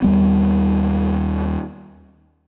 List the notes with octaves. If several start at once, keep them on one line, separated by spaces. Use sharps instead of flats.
D#2 G3 B3